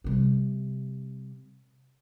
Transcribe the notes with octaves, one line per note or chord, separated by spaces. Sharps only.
C3 G3